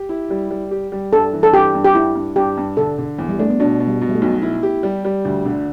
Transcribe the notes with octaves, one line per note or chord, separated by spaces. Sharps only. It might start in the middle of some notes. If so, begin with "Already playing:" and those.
Already playing: G4
E4
G3
G3
G4
G3
G2 A4
E3
A4
G2 G4
G2
G4
G2 E4
G2
G2 G4
G2
D3 A4
D3
E2
G3
A3 D4
B3
B2 D4
B2
G3
B2
G3
A3
B1
B3 E4
G4
G3
G3
D2
D3